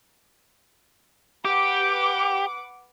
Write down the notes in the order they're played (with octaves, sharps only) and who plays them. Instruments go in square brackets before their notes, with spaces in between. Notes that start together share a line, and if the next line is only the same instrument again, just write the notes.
[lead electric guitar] G4 [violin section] B4 F#5 D6